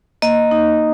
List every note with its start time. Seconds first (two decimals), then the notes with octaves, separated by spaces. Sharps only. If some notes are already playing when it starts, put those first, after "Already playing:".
0.22 A#3 D#5
0.51 D#4